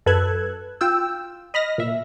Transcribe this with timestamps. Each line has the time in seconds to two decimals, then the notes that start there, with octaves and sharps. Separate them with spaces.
0.06 F#2 A4 B4 E6 F#6 G#6
0.81 F4 G5 E6
1.54 D#5 B5 F6 A#6
1.78 A#2 E5